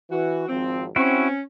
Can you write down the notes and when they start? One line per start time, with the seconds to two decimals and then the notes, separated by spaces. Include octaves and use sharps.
0.10 E3 F#4
0.48 G#1 F3 C4
0.96 C4 C#4 E4 F#4